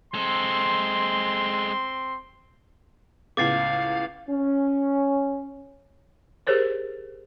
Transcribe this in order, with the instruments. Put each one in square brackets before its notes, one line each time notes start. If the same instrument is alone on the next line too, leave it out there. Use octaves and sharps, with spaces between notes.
[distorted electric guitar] G#3 A4 [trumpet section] C4 C6
[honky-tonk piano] C#2 A2 B3 [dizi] F5 [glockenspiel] D6 A6 C7
[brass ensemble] C#4
[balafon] G4 G#4 A#4 C5 C#5